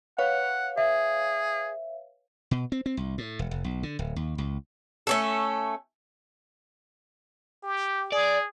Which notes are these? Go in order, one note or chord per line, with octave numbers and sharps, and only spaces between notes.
B4 C#5 F5 F#5
G#4 E5
B2
C4
C4
C2
A2
E1
F1
B1
D3
D1
D#2
C#2
A3 C#4 A4
G4
G#4 D5